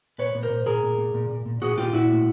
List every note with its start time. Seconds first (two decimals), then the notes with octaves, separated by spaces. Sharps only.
0.18 A#2 B4 C#5
0.35 A#2
0.43 A#4 C5
0.50 A#2
0.66 A#2 G#4 A#4
0.83 A#2
0.98 A#2
1.14 A#2
1.30 A#2
1.45 A#2
1.62 A#2 F#4 G#4
1.78 A#2 F4 G4
1.93 A#2 E4 F#4
2.10 A2